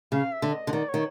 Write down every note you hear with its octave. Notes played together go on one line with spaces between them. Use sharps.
C#3 F5
E5
D3
D#5
D3
D#3 D5
C#5
D#3